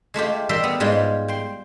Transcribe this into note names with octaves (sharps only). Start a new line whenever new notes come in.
G#3 A3 F4 G4
G3 A#4 E5 G5 C6
B3
G#2 G3 G#3 F4
G5 C6